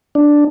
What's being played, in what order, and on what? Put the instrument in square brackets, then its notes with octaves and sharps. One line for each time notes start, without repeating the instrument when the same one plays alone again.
[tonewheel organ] D4